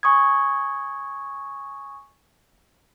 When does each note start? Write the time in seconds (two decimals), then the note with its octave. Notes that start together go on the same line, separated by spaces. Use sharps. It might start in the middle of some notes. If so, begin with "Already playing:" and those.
0.03 G#5 C#6 D#6 G#6